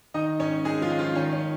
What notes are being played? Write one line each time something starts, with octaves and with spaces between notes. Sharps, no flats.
D#3 D#4 D#5
G#2 C#4 C#5
G#2 G#3 G#4
F3 F4
D#3
F3 F4
D#3 C#4
C#4